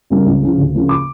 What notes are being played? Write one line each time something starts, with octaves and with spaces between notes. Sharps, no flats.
C#3 G3 A#3
C#2
C#3 F3
D2
C#3 F3 A#3
D6